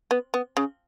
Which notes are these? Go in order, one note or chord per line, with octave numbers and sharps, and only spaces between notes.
B3
B3
C#3